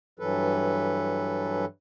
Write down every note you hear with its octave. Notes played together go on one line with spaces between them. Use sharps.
G2 E3 F#3 A4 B4